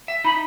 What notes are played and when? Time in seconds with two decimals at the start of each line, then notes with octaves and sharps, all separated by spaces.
0.08 E5
0.24 D#4 B5